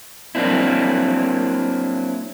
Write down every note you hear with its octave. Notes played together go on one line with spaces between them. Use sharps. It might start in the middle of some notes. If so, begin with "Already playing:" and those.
F#3 A#3 C4 D4 E4